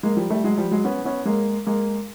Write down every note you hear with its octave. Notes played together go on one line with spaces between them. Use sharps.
G#3 A#3
F3 G3
G3 A3
F#3 G#3
F3 G3
F#3 G#3
B3 C#4
B3 C#4
G#3 A#3
G#3 A#3